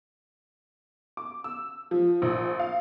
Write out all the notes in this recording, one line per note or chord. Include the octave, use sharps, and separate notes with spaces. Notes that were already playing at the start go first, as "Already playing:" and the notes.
D6
E6
F3
A#1
F5